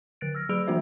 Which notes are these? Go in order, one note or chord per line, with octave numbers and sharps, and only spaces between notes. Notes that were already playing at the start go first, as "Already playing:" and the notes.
D3 F#6 A6 D7
E6 F6 A#6
F#3 G#4 B5 E6 D7 F7
E3 A#3 D4 F#4 C5 E5